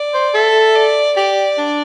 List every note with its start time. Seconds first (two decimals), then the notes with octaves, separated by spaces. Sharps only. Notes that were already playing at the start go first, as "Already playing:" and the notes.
Already playing: D5
0.14 C5
0.34 A4 E5
0.75 D5
1.16 G4 D5
1.58 D4